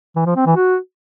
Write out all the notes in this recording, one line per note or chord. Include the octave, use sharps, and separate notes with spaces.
E3
F3
C4
E3
F#4